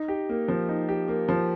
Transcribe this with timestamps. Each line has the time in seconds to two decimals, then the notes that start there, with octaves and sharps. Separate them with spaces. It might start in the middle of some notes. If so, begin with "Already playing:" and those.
Already playing: D#4
0.08 G4
0.29 A#3
0.48 F3
0.69 D#4
0.89 G4
1.08 A#3
1.29 F3